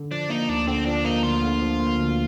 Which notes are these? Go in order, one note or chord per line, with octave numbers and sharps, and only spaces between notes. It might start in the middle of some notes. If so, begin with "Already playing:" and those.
Already playing: D3
F3 D4
A#3 D#4
D2 D4
D3 C4
F3 D4
A#3 D#4
D2 F4
D3
F3
A#3
D2